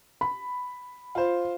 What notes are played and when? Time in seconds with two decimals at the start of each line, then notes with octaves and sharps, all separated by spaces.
0.21 B5
1.15 F4 C5